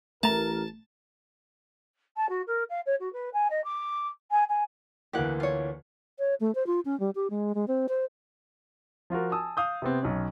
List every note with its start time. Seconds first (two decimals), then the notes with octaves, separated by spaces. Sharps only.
0.23 A1 A3 A#4 A5 A#5
2.16 A5
2.29 F#4
2.47 A#4
2.69 F5
2.86 C#5
3.00 F#4
3.13 B4
3.33 G#5
3.50 D#5
3.64 D6
4.31 G#5
4.49 G#5
5.13 D2 E3 A#3 G4 F#5
5.40 F4 C#5
6.19 C#5
6.40 A3
6.55 C5
6.66 F4
6.85 C#4
7.00 G3
7.15 G4
7.30 G#3
7.55 G#3
7.68 C4
7.88 C5
9.10 F3 F4 F#4 A#4
9.32 G#5 A5 D#6 E6
9.57 F5 D#6 G6
9.82 C3 B3 C4
10.03 B1 C#4